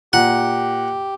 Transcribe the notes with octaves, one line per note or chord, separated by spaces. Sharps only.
A#2 G4 F#5